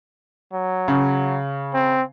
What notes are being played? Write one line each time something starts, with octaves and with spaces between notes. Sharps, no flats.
F#3
C#3
C4